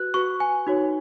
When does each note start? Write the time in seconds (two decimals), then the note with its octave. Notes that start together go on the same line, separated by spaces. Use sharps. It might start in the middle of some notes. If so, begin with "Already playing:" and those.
Already playing: F#4 B4 F#6
0.14 F#4 B4 C#6
0.40 G#5
0.67 D#4 F#4 C#5